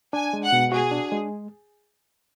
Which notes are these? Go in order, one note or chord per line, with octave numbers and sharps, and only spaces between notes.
D4 G#5
G#3
F#5
B2
F#4 G#4
D4
G#3